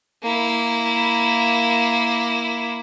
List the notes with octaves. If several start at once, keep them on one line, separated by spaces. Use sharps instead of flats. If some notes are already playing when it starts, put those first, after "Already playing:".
A#3 E4